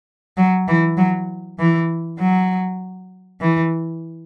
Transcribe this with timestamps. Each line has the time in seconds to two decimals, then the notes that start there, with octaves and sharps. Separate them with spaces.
0.37 F#3
0.68 E3
0.97 F#3
1.59 E3
2.19 F#3
3.41 E3